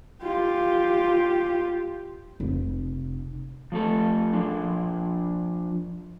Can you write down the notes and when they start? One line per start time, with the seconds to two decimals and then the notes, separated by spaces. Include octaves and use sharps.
0.23 F4 G4
2.40 F1
3.72 F3 A3 A4
4.33 F3 D4